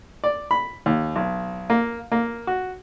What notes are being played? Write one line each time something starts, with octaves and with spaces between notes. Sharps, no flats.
D5
B5
D#2
B1
A#3
A#3
F#4